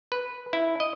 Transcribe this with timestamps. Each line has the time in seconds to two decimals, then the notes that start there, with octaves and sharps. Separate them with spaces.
0.12 B4
0.53 E4
0.80 D#5